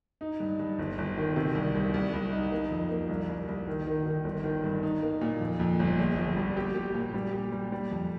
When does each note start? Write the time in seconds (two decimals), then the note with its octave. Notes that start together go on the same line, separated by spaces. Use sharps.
0.21 D#4
0.40 G2
0.59 G2
0.79 G1
0.98 G1
1.17 D#3
1.36 C3
1.55 C2
1.75 C2
1.94 C2
2.13 C2
2.32 D#4
2.51 A#3
2.71 F2
2.91 A#3
3.09 C2
3.29 C2
3.48 C2
3.67 D#3
3.87 D#3
4.06 D#3
4.24 G1
4.44 D#3
4.64 G2
4.83 D#4
5.02 A#3
5.21 A#2
5.41 F2
5.60 F2
5.79 G1
5.99 A#1
6.18 A#1
6.37 G3
6.57 G4
6.75 G4
6.94 A#2
7.14 G3
7.33 G4
7.52 G3
7.72 G3
7.91 F2